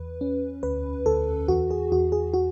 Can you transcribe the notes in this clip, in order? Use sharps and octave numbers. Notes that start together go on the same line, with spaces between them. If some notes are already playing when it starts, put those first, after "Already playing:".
Already playing: E2 B4
C#4
D2 B4
D2 A4
E2 F#4
G#4
E2 F#4
G#4
F#4